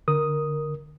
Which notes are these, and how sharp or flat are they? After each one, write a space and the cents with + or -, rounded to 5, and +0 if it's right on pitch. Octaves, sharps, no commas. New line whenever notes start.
D3 +0 A#4 +0 D#6 +0